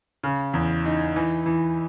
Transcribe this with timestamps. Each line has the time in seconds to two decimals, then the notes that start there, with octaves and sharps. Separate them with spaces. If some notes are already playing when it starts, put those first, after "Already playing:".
0.23 C#3
0.53 E2
0.85 D#4
1.16 E3
1.46 E3